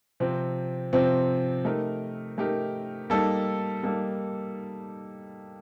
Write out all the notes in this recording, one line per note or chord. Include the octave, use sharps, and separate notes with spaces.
C3 F3 C4
C3 F3 C4
A3 D#4 G4 A#4
A3 D#4 G4 A#4
G3 A#3 D#4 A4
G3 A#3 D#4 A4